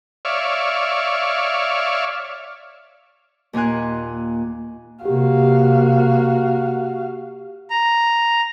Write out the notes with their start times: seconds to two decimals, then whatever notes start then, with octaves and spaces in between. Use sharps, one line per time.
0.25 C#5 D5 E5 F5
3.53 D#2 A#2 F4 G#5 F#6
5.05 C3 A#3 F#4 G4 F5
7.70 A#5